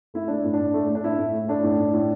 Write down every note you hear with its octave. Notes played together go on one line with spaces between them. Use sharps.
A3 E4
A3 D4
A2
D4
A2
A3
A3
D4
A2 E4
A2
A3
A3 D4
A2
A2
A2